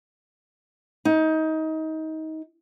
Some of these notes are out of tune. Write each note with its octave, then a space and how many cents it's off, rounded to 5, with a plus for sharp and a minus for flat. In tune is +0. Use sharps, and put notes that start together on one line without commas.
D#4 +25